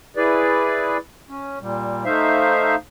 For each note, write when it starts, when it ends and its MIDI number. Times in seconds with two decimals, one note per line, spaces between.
0.17 0.97 64
0.17 0.97 68
0.17 0.97 71
0.17 0.97 74
1.29 1.59 61
1.61 2.04 46
1.61 2.04 55
2.05 2.75 57
2.05 2.75 63
2.05 2.75 72
2.05 2.75 76
2.05 2.75 77